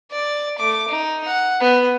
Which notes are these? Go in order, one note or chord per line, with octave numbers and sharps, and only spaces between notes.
D5
A3 D6
D#4
F#5
B3